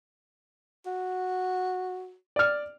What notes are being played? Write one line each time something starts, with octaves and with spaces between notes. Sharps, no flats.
F#4
D5 F6